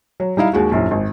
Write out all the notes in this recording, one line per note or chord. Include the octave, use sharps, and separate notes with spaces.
F#3
G3 D#4 E4 F5
D#2 G#3 F#4
A#1 F#2 E3
G#1